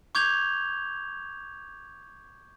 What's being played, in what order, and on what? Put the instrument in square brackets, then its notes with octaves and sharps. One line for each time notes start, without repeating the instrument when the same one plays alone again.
[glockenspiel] C#6 D6 G6 G#6 F7 G7